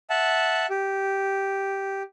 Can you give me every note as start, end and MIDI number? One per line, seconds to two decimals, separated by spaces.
0.10 0.66 76
0.10 0.66 78
0.10 0.66 81
0.70 2.03 67